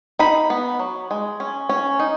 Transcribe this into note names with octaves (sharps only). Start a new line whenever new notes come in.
D#4 B5
B3
F#3
G#3
C#4
C#4
D#4